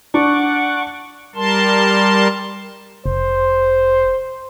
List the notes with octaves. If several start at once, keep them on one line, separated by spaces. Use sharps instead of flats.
D4 F#5 C#6 D6
G3 A#4 A5 C6
F1 C5